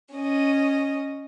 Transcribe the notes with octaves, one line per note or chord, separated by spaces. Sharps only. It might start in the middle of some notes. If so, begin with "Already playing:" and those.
C#4 D#5